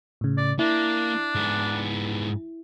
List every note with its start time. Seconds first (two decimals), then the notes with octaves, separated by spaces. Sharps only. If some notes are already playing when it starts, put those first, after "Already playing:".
0.21 A2 C#3
0.37 D5
0.59 A#3 D4 E4
1.35 G#2 B3